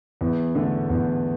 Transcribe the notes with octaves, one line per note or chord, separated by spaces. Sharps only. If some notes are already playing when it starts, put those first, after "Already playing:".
E2
D3 A3
E2